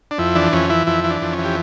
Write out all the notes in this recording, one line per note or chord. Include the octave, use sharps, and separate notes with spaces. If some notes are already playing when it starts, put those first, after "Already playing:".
D4
F2 E4
E3 D4
F2 C#4
E3 E4
F2 E4
E3
D4
F2
C#4
E3
G4